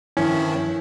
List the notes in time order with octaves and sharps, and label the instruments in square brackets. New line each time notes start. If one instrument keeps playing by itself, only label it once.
[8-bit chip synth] G2 D#3 F3 [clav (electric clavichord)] C#4 [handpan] E4